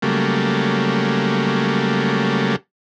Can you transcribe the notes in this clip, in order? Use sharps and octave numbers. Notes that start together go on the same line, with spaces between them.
C#3 F#3 G3 A3 A#3